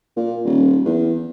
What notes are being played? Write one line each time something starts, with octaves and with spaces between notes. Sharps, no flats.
A#2
D#1
E2